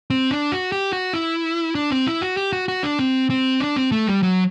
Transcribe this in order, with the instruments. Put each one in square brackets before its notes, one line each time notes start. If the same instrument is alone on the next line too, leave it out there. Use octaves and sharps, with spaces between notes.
[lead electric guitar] C4
D4
F#4
G4
F#4
E4
D4
C4
E4
F#4
G4
F#4
F#4
D4
C4
C4
D4
C4
A3
G3
F#3